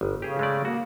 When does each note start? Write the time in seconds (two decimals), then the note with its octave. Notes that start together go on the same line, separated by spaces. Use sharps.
0.01 G1
0.22 C#3 G4 G#4
0.39 G#3 A3 D5
0.65 A#3 F#4